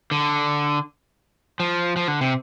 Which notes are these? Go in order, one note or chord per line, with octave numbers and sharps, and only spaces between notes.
D3
F3
F3
D3
C3